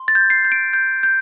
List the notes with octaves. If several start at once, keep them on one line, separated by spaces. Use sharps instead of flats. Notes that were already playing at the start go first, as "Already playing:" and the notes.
Already playing: C6
A6
G6
C7
G6
D7
G6
G6